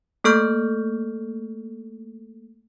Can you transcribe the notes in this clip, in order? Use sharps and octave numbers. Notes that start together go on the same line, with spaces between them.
A3 A#3 A4 C#6 F6 G6